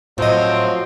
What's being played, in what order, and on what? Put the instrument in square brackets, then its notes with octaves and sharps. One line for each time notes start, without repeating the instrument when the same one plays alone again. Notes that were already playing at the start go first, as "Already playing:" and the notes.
[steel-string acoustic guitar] A2 D#5 [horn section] F3 F#3 C4